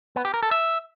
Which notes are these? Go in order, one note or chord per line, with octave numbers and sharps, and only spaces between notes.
B3
G4
A#4
A4
E5